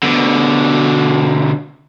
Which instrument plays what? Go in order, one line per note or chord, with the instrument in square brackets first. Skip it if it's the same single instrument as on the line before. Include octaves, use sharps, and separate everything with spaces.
[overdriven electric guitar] B2 D3